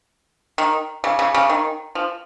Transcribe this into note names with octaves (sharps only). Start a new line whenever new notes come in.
D#3
C#3
C#3
C#3
D#3
F3